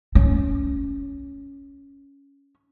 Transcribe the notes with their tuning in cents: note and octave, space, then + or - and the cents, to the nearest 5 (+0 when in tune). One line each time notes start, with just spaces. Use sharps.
C#4 +5